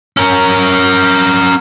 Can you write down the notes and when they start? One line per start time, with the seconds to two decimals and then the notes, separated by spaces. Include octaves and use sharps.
0.17 C#4 A#4